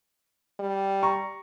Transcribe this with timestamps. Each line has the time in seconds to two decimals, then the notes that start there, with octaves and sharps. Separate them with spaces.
0.60 G3
1.03 A#5 C#6